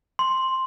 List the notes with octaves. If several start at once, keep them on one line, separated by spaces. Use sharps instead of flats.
C6